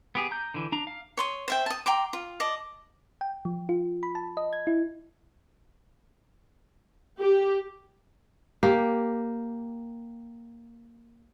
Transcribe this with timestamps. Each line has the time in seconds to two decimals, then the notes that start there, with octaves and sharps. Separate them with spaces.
0.15 B3 G4 G#4
0.31 A#5 G6
0.54 D3 E3
0.72 D4 A#5
0.87 F5
1.17 C#5 C6 D#6
1.48 C5 E5 G5
1.66 A5 D#6
1.86 G5 A#5 C6 D6
2.13 F4
2.40 D5 D#5 A5
3.21 G5
3.45 F3
3.69 F4
4.03 B5
4.15 A5
4.37 D#5
4.53 G#6
4.67 E4
7.19 G4
8.63 A#3 G4